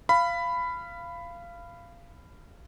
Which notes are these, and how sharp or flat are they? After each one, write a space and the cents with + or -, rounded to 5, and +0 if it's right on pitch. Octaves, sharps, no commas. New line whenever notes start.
F5 -20 B5 +10